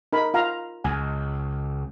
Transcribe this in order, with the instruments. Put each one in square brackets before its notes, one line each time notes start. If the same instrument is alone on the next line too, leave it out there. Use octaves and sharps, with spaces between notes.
[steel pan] D#4 A#4 B5
F4 F5 A#5
[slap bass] C#2 [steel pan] G#5